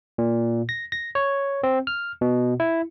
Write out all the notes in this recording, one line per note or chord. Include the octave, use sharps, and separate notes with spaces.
A#2
A#6
A#6
C#5
C4
F6
B2
E4